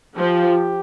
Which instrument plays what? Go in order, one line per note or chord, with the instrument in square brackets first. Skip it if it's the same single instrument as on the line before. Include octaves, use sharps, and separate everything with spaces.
[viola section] F3 [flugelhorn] G4